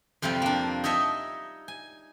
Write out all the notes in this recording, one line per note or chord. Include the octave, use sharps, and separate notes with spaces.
F2 C3 F3 G3 C4
A#3 D4
D#4 C#5 D#5 E5 A5
G#5